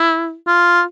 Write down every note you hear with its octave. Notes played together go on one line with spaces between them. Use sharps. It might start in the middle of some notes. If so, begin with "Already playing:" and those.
Already playing: E4
F4